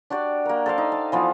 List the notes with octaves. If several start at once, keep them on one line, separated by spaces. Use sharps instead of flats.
D4 F#4 G4 D5
A#3 A#4
A4 C5 F5
D#4
A5
E3 F3 B3